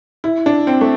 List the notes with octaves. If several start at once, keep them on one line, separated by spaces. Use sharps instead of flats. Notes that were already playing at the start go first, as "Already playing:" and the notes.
E4
D4
C4
A3